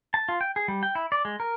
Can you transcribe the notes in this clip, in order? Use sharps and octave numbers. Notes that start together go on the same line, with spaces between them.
A5
F4
G5
G#4
G3
G5
E4
D5
G#3
A#4